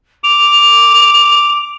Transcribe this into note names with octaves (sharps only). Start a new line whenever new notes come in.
D6 F7